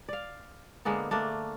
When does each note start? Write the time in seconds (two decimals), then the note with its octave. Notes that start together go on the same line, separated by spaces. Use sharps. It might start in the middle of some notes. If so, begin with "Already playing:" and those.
0.09 D5 F5
0.85 D3 G#3 A#3 B3
1.11 A3 A#3 D4